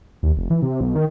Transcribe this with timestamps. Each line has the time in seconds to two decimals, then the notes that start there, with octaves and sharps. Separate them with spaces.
0.23 D#2
0.37 F1
0.50 E3
0.62 C3
0.81 B1
0.95 D#3